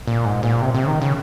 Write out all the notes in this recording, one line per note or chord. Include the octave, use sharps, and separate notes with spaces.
A#2
G#2
A#2
C3
C3
C#3
D#3
C#3